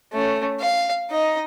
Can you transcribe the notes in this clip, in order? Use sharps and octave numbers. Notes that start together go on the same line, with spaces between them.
A3 C#4
F5
D#4 D#5